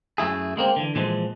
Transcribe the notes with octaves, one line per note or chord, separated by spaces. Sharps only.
F#2 A3 E4 G#4
G#3 A#3 C4
D3 E3
A#2 E3 F3 G#3